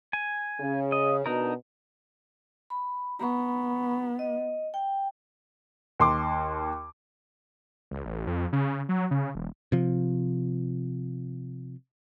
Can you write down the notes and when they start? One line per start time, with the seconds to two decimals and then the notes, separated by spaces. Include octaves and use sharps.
0.13 G#5
0.58 C#3
0.92 D#5
1.26 B2 D4 D#4 A#4
2.70 B5
3.19 B3 A#5 B5 C#6
4.19 D#5
4.74 G5
5.99 D#2 C6 D6
7.91 C#2
8.05 A1
8.27 F2
8.53 C#3
8.89 F#3
9.11 C#3
9.35 E1
9.72 C3 F3